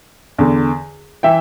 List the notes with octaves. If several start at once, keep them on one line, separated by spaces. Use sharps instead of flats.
E2 D3
E3 E5 G5